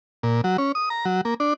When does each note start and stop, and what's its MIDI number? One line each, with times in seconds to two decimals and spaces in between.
0.23 0.41 46
0.44 0.57 54
0.58 0.72 61
0.75 0.89 87
0.90 1.05 82
1.05 1.21 54
1.25 1.34 58
1.40 1.53 62